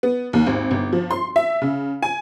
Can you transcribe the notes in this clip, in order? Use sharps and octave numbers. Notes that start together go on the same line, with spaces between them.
B3
D#2
G#1
G1
F3
C6
E5
C#3
G#5